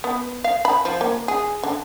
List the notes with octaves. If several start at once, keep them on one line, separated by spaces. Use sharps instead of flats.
B3
F5
B5
F3
A#3
G#4
D3